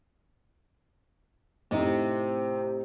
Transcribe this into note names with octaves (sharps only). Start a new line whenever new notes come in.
A2 C3 D#4